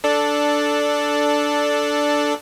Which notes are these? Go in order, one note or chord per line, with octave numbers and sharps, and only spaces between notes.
D4 A4 D5